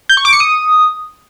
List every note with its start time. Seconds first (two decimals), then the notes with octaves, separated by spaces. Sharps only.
0.09 G6
0.17 C#6
0.25 D6
0.33 C#7
0.40 D#6